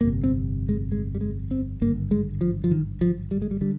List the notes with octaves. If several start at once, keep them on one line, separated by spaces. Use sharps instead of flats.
G1 F2 C3 A#3
C4
G#3
G#3
G3
G#3
C4
G#1 G2 D3 A#3
G#3
F3
F3
D#3
F3
G3
G#3
G3
D3 G3